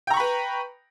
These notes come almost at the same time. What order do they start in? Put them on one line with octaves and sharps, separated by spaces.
G5 A#5 C#6 B5 B4